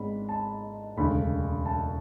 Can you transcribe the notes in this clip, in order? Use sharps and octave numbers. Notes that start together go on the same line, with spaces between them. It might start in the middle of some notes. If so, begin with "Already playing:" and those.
Already playing: G#1 G#2 G#3 B3 D4 B5
A5
E1 D2 C#3 B5
A5